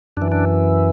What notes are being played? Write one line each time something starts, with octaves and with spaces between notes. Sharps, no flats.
F#2 E3 D4
D4